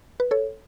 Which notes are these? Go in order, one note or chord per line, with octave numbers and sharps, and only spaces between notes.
B4
A4 C#5